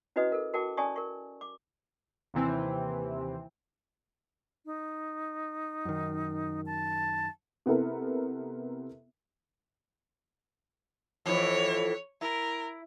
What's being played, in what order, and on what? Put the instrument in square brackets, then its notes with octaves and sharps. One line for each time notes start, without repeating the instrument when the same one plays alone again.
[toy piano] C#4 E4 F#4 B4 D#5 D#6
A4 A#4
F#4 A#4 G5 A5 D6
C#4 D5 G#5 A5 C#6 D#6
A#4 C#6
D6
[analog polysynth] D#2 C3 E3 C4
[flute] D#4
[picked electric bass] F#2 D#3
[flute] A5
[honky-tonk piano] C3 B3 E4 A4 A#4
[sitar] F2 A2 E3 [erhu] C#5
[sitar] E4 [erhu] A#4